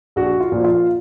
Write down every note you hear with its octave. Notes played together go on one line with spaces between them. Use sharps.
A#1 F#4
F4
A#2 F3
F4